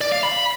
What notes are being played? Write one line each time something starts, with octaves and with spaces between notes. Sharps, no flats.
D5
F5
B5